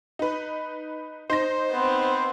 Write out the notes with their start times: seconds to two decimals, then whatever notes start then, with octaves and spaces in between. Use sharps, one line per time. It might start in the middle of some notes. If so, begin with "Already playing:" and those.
0.19 D#4 B4
1.30 D#4 C5 A#6
1.71 B3 C4